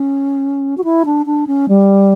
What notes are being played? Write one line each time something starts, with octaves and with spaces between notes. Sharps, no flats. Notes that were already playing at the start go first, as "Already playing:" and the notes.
Already playing: C#4
F#4
E4
D4
D4
C#4
G3